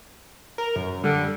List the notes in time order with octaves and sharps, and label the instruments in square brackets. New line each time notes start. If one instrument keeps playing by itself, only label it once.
[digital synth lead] A#4
F#2
[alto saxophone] D3 [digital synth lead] G3